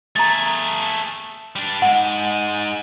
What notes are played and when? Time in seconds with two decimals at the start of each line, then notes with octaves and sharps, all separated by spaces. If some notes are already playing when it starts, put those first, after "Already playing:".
0.16 A3 G#4 A#5 A6
1.56 G3 D4
1.82 G#2 G#3 F#5